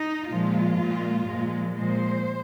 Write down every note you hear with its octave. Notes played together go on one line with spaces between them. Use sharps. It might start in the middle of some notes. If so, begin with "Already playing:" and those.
Already playing: D#4
A#2 F3 G#3 F4
A#2 G#3
A#2 F3 G#3
A#2 F3 G#3 C5